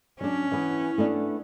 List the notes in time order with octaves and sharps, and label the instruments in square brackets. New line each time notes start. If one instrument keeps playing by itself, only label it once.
[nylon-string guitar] F#3 D4 [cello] C#4
[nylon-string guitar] E3 B3
A3 B3 D4